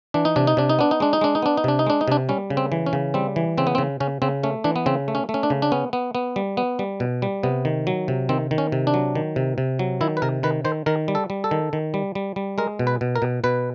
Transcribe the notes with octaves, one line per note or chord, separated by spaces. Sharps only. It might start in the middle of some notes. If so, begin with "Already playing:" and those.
E3 D4
D#4
C3 D4
D#4
C3 D4
D#4
B3 D4
D#4
G#3 D4
D#4
G#3 D4
D#4
B3 D4
D#4
C3 D4
D#4
G#3 D4
D#4
C3 D4
G3 C#4
C#3
C4
E3
C#4
C#3
G3 C4
E3
C#3 C4
B3
C4
C#3
C#3 C#4
C#3 C4
A3 C#4
E3 D4
B3
C#3 C4
A3
C#4
A3
C#4
D4
C#3
D4
B3 C#4
B3
B3
G3
B3
G3
B2
G3
C3 B3
D#3
F#3
C3
D#3 C4
D#3
C#4
C3
D4
F#3
D#3
C3
C3
F#3
D#3 E4
B4
C3 A#4
D#3 B4
D#3 C5
D#3 A#4
G3
A4
G3
A4
D#3
D#3
G3
G3
G3
G#3 A#4
B2
B4
B2
A#4
B2
B2 B4